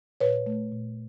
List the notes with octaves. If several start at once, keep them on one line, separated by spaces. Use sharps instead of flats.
A#2 B4 C#5
A3
A#2